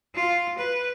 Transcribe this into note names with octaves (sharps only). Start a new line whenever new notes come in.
F4
B4